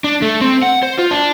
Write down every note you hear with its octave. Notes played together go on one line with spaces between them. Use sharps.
D4
A3
C4
F#5
C5
F4
D4